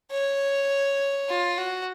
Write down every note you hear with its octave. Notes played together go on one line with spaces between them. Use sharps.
C#5
F4
F#4